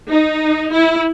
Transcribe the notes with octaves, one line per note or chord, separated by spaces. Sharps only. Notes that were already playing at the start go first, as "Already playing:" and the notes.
D#4
E4